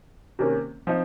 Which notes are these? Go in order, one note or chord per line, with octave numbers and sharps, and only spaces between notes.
C3 D#3 A#3 C#4
F3 C4 D#4